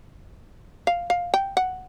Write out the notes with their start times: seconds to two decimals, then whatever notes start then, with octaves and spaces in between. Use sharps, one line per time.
0.87 F5
1.10 F5
1.34 G5
1.57 F#5